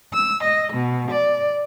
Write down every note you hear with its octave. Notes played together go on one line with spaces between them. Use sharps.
E6
D#5
B2
D5